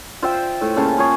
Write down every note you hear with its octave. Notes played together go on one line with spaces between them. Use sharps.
F4 C5 E5 G5
A2
C#3 A#3 F5 A5
F4 G#4 C#5